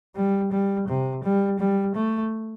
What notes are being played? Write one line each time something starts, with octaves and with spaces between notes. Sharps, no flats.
G3
G3
C3
G3
G3
A3